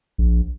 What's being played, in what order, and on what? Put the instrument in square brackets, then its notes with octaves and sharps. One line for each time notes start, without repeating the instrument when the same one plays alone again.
[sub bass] A#1